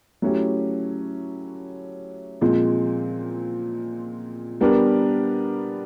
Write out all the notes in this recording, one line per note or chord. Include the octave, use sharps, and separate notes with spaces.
F#3 A3 C#4 E4 G4
A#2 F3 G#3 C4
G3 B3 D4 G4 A#4